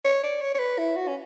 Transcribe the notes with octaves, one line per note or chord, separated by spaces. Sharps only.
C#5
D5
C#5
C#5
B4
E4
F#4
C#4